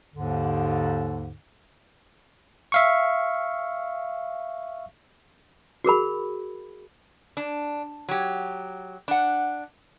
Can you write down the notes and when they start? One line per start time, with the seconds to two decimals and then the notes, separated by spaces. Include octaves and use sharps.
0.15 D#2 G#2 D3
2.72 E5 F5 C#6
5.84 F#4 G#4 A#4 B5
7.37 D4
8.09 F#3 G4
9.08 D4 F#5